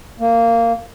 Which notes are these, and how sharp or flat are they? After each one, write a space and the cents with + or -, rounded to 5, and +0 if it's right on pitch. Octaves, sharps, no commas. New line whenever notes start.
A#3 -15